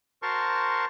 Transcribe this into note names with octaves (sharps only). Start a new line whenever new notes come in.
F#4 A#4 C5 A5 C6 C#6